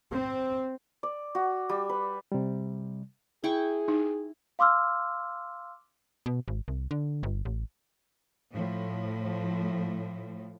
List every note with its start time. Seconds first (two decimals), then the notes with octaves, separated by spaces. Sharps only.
0.11 C4
1.03 D5
1.35 F#4
1.69 G3
1.89 B4
2.32 C3 G3
3.44 E4 G#4 G5 C#6
3.88 D#4
4.59 F5 C6 D6 E6 F6
6.26 B2
6.48 G#1
6.68 C2
6.91 D3
7.23 G1
7.45 A1
8.51 A2 F3